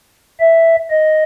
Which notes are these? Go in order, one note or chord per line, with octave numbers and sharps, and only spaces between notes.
E5
D#5